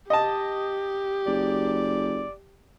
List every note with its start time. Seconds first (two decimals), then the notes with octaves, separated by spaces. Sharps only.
0.10 G4 D#5 A5
1.26 F#1 D5